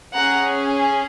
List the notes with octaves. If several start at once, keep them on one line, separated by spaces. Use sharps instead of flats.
C#4 G#4 F#5 A#5